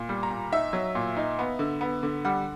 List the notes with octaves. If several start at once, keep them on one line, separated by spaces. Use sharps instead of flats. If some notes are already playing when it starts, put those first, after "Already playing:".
Already playing: A#2
G3
A#5
A#2
D#4 E5
F#3
A#2
D#4
B3
D3
B3
D3
G3 F#5